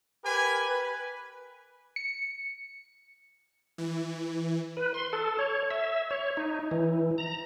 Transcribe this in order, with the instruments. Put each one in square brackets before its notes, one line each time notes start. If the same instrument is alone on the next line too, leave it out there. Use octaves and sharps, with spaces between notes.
[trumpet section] G4 A#4 B4 G#5
B4
[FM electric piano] C#7
[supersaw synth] E3
[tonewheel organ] B4
C6
A4
C#5
E5
C#5
D#4
E3
A#5